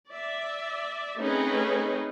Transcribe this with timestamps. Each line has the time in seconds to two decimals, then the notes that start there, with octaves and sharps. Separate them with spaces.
0.11 D5 E5
1.18 A3 C4 C#4 D#4 G#4 B4